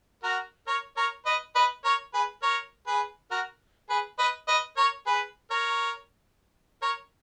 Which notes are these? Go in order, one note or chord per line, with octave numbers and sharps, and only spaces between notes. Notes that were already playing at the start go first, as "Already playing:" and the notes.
F#4 A#4
A#4 C#5
A#4 C#5
B4 D#5
B4 D#5
A#4 C#5
G#4 B4
A#4 C#5
G#4 B4
F#4 A#4
G#4 B4
B4 D#5
B4 D#5
A#4 C#5
G#4 B4
A#4 C#5
A#4 C#5